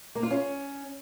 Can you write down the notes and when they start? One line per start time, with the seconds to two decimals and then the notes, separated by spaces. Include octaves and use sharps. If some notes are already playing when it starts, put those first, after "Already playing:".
0.15 A#3
0.23 F4
0.31 C#4